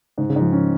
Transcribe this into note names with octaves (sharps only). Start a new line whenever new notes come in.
G#2 C#3
C#3
G#2 F3
C#4